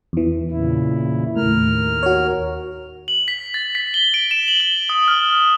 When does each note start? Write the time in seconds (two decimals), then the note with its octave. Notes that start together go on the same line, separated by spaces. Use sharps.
0.13 E2 E3
0.51 A#2 C#3 E4
1.36 D#2 A2 A#4 F6
2.03 F#4 C#5
3.08 F#7
3.28 B6
3.54 A6
3.75 B6
3.94 G7
4.14 D7
4.31 E7
4.48 F#7
4.60 G7
4.89 D#6
5.08 F6